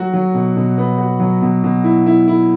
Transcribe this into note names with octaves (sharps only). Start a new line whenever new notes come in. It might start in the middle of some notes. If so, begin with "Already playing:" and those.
Already playing: F#3 F#4
F#3
B2
B2
B3
F#4
F#3
B2
B2
E4
E4
E4